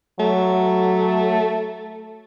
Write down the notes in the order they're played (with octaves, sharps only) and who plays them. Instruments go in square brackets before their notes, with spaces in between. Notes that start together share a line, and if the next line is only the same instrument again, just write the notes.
[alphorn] F#3 [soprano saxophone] A3